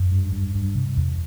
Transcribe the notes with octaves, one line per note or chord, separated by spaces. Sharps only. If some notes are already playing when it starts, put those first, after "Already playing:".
Already playing: F#2
G2
G2
G2
C3
E2